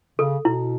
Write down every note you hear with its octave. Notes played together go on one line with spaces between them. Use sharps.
C#3 A4
B2 E4